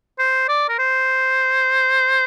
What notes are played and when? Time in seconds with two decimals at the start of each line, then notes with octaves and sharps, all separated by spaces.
0.19 C5
0.49 D5
0.69 A#4
0.79 C5